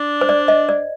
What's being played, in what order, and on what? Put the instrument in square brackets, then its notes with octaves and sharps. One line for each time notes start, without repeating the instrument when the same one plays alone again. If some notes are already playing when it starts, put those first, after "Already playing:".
Already playing: [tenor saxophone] D4
[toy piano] C5
D5
D#5
D5